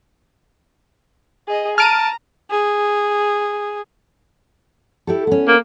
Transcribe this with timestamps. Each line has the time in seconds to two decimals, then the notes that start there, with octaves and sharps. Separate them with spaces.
1.48 G#4 D#5
1.78 A5 A#5 F6 D7 D#7
2.51 G#4
5.07 E4 G4 A4
5.27 B3 C#4
5.48 A#3